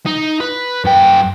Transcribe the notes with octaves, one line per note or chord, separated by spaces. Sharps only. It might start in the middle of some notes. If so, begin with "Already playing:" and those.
D#4
B4
F#2 G5